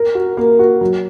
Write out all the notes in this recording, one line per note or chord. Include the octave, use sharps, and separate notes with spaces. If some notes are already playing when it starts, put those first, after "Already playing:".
Already playing: A#4
F#4
A#3
F#4
F#3